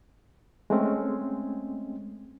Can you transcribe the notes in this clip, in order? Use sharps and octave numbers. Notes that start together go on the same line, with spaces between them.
G#3 A3 C4 C#4